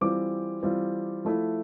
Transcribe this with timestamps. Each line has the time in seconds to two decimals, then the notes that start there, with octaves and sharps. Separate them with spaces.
0.01 E3 G3 C4 F4 D6
0.63 E3 G3 C4 F4
1.25 F3 A3 E4